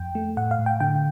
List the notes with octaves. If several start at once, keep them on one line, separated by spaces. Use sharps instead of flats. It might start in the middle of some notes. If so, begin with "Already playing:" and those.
Already playing: F2 G5
A3
A2 F#5
F5
A2
G5
D3 G5